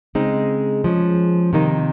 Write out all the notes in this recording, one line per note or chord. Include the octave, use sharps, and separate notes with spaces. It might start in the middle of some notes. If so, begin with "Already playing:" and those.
C#3 G#3 C4 D#4
F3 G#3 C#4
C3 D#3 A#3 D#4